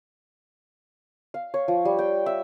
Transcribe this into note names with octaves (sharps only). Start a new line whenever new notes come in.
F5
C#5
F3
G3
G5
E5